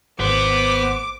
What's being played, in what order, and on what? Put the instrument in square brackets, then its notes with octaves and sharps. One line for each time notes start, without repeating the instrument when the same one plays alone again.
[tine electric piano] G#1 [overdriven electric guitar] B3 [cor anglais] C5 [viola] D6